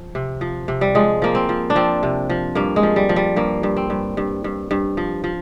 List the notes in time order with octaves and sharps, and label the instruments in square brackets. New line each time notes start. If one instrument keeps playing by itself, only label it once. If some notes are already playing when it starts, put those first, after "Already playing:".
Already playing: [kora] F3
C3
F3
C3
G3
F3 G#3
F3 A#3
C4
F3
D4
F3 C4
C3
F3
G2 A#3
G#3
F3
G3
F3
G3
G2 A#3
G2
C4
G2
G2
G2
G2
F3
F3